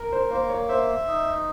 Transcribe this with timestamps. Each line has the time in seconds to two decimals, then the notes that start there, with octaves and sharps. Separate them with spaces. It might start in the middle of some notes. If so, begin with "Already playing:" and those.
Already playing: A#4
0.12 C5
0.31 A#3 C5
0.49 C#5
0.69 C5 E5
1.07 D#4